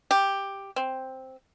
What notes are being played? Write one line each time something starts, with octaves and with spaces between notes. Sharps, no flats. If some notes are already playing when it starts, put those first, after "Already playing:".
G4
C4